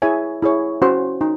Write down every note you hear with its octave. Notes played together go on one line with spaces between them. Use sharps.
E4 G#4 C#5 E5 G#5
E4 G#4 C#5
C#4 F#4 C5
D#4